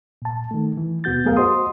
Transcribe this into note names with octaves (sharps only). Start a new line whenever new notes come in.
A#2 A5
D#3 A3
E3
D#2 B2 B3 F#4 G6 A6
F#3 A3 B3 G#4 A#4 F5
F#4 C5 D#5 C6 D#6